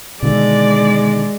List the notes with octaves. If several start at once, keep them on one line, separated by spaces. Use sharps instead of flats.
B2 D3 D#3 G#3 D5